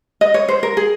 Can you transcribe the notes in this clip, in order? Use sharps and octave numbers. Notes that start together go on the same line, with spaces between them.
D#5
C#5
C5
A#4
G#4